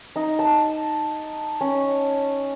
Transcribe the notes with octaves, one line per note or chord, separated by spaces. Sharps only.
D#4
A5
C#4